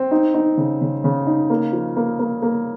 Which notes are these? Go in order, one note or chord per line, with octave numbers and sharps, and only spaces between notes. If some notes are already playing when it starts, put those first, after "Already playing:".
Already playing: C4
D#4
D#4
C#3
C#3
C#3
D#4
A#3
F3
A#3
A#3
A#3